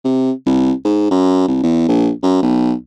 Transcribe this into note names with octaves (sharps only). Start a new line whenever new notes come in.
C3
C2
G#2
F#2
C2
E2
A#1
F#2
B1